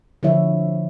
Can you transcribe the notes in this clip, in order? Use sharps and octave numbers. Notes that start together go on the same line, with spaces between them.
D3 F3 E4 C#5 E5